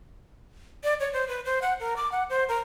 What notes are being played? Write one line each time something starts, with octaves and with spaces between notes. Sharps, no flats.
D5
C#5
C5
B4
C5
F#5
A#4
D6
F#5
C5
A#4